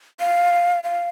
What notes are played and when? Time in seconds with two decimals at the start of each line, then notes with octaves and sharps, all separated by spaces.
0.20 F5
0.84 F5